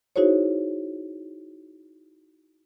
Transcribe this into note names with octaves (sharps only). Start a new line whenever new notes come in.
D#4 E4 F#4 G#4 C5 C#5